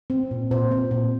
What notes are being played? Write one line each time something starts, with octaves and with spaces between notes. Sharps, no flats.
C4
A#2
A#2 C5
C4
A#2